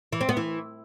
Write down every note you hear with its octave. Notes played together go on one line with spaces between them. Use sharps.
E3
C4
B3
E3